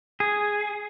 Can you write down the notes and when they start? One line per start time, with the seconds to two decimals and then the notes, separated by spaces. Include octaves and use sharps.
0.20 G#4